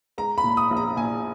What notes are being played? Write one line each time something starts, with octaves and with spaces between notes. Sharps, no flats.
G#3 A#5
B5
A#2
D#6
A#1
A#5
A#2 G#5